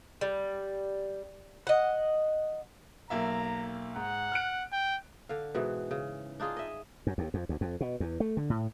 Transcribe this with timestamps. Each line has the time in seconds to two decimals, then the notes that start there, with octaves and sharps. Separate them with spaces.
0.21 G3
1.67 D#5 F#5
3.10 B1 A#3 E5 A#5
3.96 G#2 F#5
4.32 F6 F#6 D7
4.73 G5
5.29 D3 F5
5.55 G#2 B2 E3
5.91 C#3
6.40 D4 D#4 F4 G#4
6.57 D#5 E5
7.07 F#2
7.18 D#2
7.34 F2
7.49 D2
7.61 F2
7.81 B2
8.00 E2
8.20 A3
8.37 D3
8.50 A2